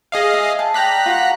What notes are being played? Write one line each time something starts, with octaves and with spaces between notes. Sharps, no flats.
G#4 D#5 F5
E5
A5
D5 G5 A#5 F#6 B6
F4 F#4 F#5